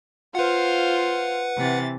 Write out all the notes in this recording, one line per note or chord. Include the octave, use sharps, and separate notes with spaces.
F4 B4 C5 F5 F#5
C3 E3 A6